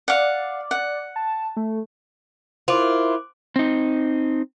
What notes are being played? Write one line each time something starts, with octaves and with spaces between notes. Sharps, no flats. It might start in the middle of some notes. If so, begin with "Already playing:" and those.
D5 F5 F#5
F#5
A5
A3
E4 F4 A#4 C5 D6
C4 D#4